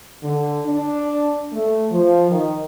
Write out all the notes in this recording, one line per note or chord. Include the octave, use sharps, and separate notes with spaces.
D3
D4
A3
F3
D#3